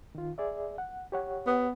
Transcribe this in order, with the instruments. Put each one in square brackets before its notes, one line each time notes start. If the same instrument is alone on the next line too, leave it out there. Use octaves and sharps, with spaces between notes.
[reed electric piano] D#3 F4
G#4 D5 E5
F#5
G4 C#5 F#5
[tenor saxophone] B3